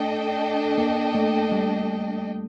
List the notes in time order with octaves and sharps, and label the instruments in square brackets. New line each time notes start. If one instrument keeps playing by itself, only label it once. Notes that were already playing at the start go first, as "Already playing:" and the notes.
Already playing: [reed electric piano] A3 [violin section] D4 A4 D#5 G5
[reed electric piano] A#3
A3
G3